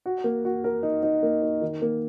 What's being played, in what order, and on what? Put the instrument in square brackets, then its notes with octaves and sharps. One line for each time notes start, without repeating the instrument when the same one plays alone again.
[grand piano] F#4
A#3
F#4
A#4
D#4
D#4
A#3
D#4
D#3
A#3